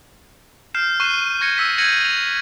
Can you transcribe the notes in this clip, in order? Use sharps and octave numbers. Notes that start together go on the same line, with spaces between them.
F6 G6 C7 E7
C#6 F#6 C7 D#7 E7
C#6 G#6 A#6 C#7
E6 B6
G6 G#6 A#6 C#7 D#7 F#7
F7